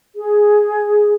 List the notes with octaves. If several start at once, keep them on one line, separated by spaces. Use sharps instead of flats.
G#4